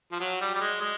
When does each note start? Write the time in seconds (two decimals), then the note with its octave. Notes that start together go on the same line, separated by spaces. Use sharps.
0.12 F3
0.20 F#3
0.41 G3
0.55 G3
0.61 G#3
0.81 G#3